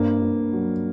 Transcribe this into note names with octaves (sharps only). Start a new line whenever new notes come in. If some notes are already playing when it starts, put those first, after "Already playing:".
Already playing: G2 A#3 C4
G2
F#3